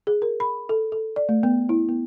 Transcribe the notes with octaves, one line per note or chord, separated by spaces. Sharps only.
G#4
A#4
B5
A4
A4
D5
A3
B3
E4
B3